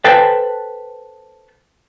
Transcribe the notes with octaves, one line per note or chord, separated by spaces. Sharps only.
A4 B4 C5 G5 A5